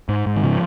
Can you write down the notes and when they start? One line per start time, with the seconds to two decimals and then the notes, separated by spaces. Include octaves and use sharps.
0.09 G#2
0.26 G#2
0.36 D#3
0.43 C#3 F3